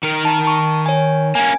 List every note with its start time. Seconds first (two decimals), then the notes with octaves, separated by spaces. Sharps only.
0.03 D#3 A#4
0.25 A5
0.45 A5 C#6
0.86 C#5 G#5
1.35 A#3 C#4 G#5